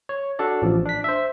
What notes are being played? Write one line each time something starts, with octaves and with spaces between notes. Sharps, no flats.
C#5
D4 F#4 A4 D5
A1 F3
D4 B6
C5 E5